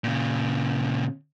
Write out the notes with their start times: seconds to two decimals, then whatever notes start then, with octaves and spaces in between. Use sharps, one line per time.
0.04 A#2 C#3